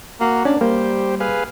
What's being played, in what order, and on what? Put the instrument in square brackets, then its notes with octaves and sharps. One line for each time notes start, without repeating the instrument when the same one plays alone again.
[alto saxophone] A#3 [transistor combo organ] F#4
[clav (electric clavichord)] C#4 [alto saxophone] D4
[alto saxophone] G3 [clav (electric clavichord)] A#3 [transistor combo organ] G4 C5
[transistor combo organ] G#4 B4 F5